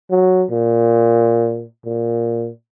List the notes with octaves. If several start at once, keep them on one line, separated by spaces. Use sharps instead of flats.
F#3
A#2
A#2